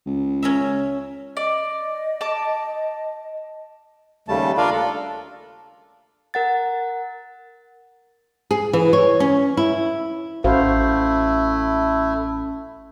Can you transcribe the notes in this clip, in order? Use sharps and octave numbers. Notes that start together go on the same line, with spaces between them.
C#2
C#4 A#4 E5
D5 D#5
A5 D6
D#2 C#3 G3 A3 A5
D4 F4 A#4 D5 F5
A4
A#4 F#5 A6
G#4
E3
C#5
C#4
E4
A1 A3 C#4 E4 F#4 C5 F5